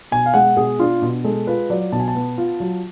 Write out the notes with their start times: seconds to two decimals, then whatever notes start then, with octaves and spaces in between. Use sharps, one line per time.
0.12 B2 G#5
0.26 F5
0.34 G#3 F#5
0.57 B2 G#4
0.79 D4 F4
1.02 B2
1.24 G#3 A4
1.47 F4 B4
1.70 F#3 D5
1.92 B2 A5
2.00 G#5
2.08 A5
2.15 B3
2.38 F4
2.60 F#3